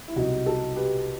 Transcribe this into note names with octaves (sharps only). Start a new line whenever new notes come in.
E4
C2 B2 F#3 D#4 F#4
F#4 A4
G4 B4